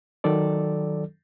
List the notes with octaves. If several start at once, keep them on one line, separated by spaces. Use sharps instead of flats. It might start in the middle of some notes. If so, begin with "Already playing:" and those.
D#3 F#3 A4 D5